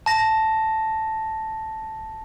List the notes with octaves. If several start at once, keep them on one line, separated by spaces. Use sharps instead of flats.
A5 A#6